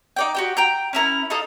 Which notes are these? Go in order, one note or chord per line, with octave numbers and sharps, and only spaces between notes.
D#4 D5 G5
F#4 G4 G5
G5 A#5 G6
C#4 E4 A#4
D#4 A4 F5 D#6